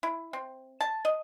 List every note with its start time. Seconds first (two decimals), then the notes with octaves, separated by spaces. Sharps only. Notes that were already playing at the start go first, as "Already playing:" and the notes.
0.03 E4
0.33 C4
0.81 A5
1.05 D#5